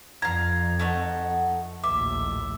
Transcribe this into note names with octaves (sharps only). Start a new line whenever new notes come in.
F2 F5 A#5 G#6
A3 D#4 F#5
A#1 D#2 A2 E5 D6